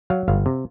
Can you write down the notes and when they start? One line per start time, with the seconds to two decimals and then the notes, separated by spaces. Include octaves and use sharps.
0.10 F#3 F5
0.28 G1 F5
0.46 C3